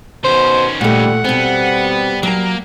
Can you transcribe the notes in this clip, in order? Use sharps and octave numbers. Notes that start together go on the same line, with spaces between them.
B2 D#3 C#4 C5
A#2 G3 A3 F#5
B2 G3 B3 C4
F#3 A#3 A#5